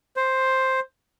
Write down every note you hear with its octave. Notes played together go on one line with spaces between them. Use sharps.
C5